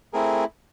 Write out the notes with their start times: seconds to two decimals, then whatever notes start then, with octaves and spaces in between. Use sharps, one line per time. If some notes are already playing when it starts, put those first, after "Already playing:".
0.13 A3 C4 E4 G#4 A#4